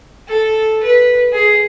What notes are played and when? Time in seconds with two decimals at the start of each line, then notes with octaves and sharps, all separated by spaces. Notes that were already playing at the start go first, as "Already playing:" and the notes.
0.28 A4
0.83 B4
1.32 G#4